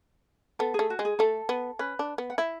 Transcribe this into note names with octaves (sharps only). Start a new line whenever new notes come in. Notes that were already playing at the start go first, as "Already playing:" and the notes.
B3 A4
A3 G#4
F#4
G#3
G#4
A3 A4
B3
C#4 B4
D4
B3
F#5
E4 E5